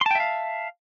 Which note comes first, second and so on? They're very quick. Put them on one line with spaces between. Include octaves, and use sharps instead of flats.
C6 A5 G5 E5 F5